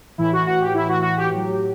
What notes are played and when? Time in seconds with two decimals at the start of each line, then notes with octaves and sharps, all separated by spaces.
0.18 A2 E3 E4
0.33 F#4
0.46 F#4
0.61 G4
0.75 E4
0.89 F#4
1.02 F#4
1.17 G4
1.30 A2 F#3 G4